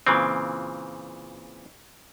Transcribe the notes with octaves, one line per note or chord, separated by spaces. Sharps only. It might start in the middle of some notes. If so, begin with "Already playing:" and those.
A#2 C#3 E3 C4